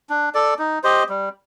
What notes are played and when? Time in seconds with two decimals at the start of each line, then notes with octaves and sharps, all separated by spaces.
0.09 D4
0.34 A4 D5
0.59 D#4
0.84 G4 C5 D#5
1.09 G3